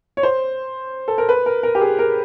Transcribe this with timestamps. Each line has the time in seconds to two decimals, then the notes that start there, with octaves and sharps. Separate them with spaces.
0.17 C#5
0.23 C5
1.08 A4
1.18 A#4
1.29 B4
1.46 A#4
1.63 A#4
1.75 G4
1.81 G#4
1.99 A#4